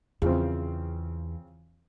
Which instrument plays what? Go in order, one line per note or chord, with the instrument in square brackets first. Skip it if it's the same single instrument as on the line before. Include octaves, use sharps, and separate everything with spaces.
[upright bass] E2 [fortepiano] C#3 F3 C4